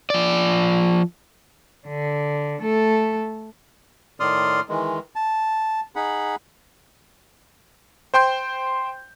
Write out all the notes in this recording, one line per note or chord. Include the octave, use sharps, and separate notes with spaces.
F3 D5
D3
A3 A4
A2 D#3 D5 C6 D#6 F6
D#3 E3 G#3
A5
D#4 G#4 F#5 B5
C5 G5 C6 G6